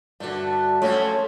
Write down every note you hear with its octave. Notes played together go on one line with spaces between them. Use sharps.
G2 D3 A3 F#4
F3 F#3 A3 C#4 F#4 C#5